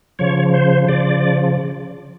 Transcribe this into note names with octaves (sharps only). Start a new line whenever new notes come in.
C#3 F3 C#5
C5
C#3 F3 D5